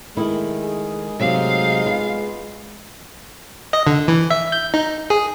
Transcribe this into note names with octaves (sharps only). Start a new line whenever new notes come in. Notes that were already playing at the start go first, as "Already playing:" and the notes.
D#3 G#3 A3 E4
G#4
C3 F#3 A3 D#4 F5
B3 F4
D#5
D3
E3
E5
G6
D#4
G#4